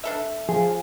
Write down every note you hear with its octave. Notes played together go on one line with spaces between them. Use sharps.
D4 A4 E5
F3 G#4